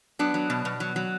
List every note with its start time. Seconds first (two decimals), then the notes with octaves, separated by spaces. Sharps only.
0.19 F#3 B3 D4
0.34 F#3
0.50 B2
0.65 B2
0.80 F#3
0.96 F#3